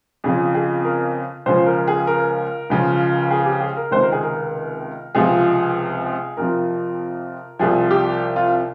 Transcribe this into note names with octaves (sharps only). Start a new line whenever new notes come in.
F2 C#3 F3 G#4
G#4
A#4
C#2 C#3 F3 C5
A#4
G#4
A#4
C#2 C#3 F3
G#4
G4
G#4
A#4
C#2 C3 D#3 C5
A#4
G#4
A#4
C#2 C3 F3 G#4
F2 C3 F3 A#4
C2 C3 F3 G#4
G4
F4